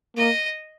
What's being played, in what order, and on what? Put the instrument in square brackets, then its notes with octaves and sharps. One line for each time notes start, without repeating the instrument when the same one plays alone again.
[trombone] A#3 [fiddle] D#5